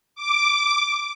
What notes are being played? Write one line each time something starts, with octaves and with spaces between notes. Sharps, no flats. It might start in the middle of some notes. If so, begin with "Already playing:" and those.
D6